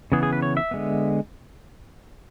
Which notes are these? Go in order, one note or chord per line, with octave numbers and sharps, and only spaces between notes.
C#3 E3 B3 G#4
G#4
B4
C#5
E5
D3 G#3 B3